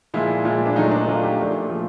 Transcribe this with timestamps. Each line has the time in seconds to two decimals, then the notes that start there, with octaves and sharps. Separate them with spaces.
0.14 A#2 F3 G#3 E4
0.45 A#2 F3 G#3 E4
0.66 D4
0.76 A#2 F#3 A3 D#4
0.92 D4
1.07 A#2 F#3 A3 F4
1.23 G4
1.38 A#2 F3 A3
1.69 A#2 F3 A3